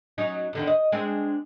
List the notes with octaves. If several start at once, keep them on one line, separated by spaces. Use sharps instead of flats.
F#3 C#4 D#4
E2 D3 D#3
D#5
G#3 C4 D4